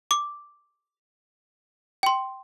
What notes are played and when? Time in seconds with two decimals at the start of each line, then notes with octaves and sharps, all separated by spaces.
0.11 D6
2.03 G5 C6